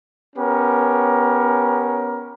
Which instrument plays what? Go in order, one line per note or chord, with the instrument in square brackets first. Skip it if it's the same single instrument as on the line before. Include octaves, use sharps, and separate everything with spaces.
[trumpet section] B3 C#4 G4 A#4